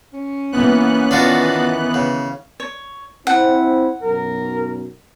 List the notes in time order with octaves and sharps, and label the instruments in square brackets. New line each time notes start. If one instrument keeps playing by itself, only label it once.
[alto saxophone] C#4
[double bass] E3 A#3 [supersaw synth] B3 F#6
[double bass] D#3 E3 [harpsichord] D4 F4 F#4
[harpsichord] C#3
[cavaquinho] C#5
[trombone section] C4 E4 [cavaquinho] F#5
[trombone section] B1 F#2 [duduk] A#4